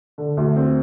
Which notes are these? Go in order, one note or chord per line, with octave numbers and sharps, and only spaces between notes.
D3
D2
C4